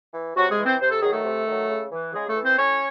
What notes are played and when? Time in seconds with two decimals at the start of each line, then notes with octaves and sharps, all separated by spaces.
0.14 E3
0.36 C3 F#3 F#4
0.51 G#3 G#4
0.58 E3
0.65 C4 C5
0.81 C3 C5
0.90 A4
1.01 D#3 F#3 G#4
1.12 A3 A4
1.25 C3
1.47 D#3 F#3
1.69 C#3
1.91 E3
2.13 C#3 G#3 G#4
2.28 A3 A4
2.36 E3
2.43 C4 C5
2.58 A2 C#4 C#5